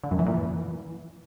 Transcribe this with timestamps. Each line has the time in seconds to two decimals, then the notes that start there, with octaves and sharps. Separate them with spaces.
0.03 D3
0.11 F#2
0.19 E3
0.27 A#2
0.34 E3